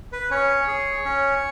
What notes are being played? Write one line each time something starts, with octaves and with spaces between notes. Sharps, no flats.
B4
C#4 C#5
G#4
C#4